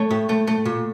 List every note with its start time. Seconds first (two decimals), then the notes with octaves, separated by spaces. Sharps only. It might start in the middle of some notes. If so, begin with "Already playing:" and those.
Already playing: A3 C#5
0.10 A2
0.29 A3
0.47 A3
0.65 A#2